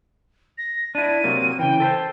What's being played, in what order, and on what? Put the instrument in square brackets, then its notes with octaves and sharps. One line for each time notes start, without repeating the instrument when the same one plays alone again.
[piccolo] A#6
[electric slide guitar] D4 E4 [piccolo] D#7
[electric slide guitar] C3 F#3 A#3
[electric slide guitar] C#3 E3 [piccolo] G5
[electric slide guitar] A4 B4 C5